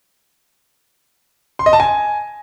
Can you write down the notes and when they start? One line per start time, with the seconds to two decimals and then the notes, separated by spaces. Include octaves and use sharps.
1.59 C6
1.66 D#5
1.73 A5
1.80 G#5